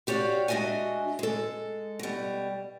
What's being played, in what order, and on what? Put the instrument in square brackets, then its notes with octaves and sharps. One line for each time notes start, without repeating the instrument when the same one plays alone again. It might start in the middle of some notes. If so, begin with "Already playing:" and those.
[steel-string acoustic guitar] F#4 G4 C#5 D5 F5
G#3 D4 F#4 D#5 E5 G#5
G#3 A4
B2 G3